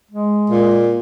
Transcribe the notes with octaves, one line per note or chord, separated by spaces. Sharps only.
G#3
A#2